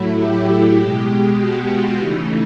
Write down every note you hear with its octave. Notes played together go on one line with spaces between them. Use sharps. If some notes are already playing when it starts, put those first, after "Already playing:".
Already playing: A2 F#3 A3 E4
G4
B2 G#3
F#4
F4
C#3 E3 A3 D#4